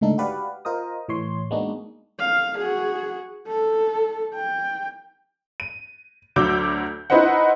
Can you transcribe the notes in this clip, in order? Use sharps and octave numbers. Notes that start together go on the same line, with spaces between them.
C#2 G#2 D3 A3 D#4 A4
F#4 G4 B4 D5 F5 F#5
F4 A#4 C5 D#5 D#6
A2 E3 C#5 C6
G#3 A#3 B3 D4 D#4 F#4
F5
F#4 G#4
A4
G5
D#7
D2 F#3 D6 E6 G6
D#4 E4 B4 C5 D#5 F#5